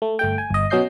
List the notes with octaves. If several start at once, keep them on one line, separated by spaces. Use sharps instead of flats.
A3
G1 A3 G5
G#5
G1 D#5
B2 F#3 C#4 D#5 G6 C7